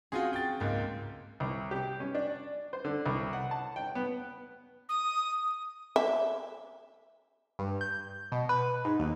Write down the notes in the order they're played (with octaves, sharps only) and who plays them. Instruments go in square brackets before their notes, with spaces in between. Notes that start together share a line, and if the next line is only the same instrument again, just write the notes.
[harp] C4 C#4 [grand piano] F4 F#4 G#4
[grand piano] G5 A6
[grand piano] C#2 A#3 [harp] G#2 A6
[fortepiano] C2
G4
C#4
D4
C5
D3
C2
F#5
A5
G5
B3
[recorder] D#6
[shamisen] E5
[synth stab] G2
G6
B2
B4
G#2
D#2